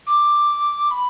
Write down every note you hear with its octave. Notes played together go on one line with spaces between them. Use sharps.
D6
B5